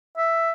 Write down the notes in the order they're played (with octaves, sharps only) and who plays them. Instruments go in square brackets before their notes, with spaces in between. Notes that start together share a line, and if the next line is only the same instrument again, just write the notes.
[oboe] E5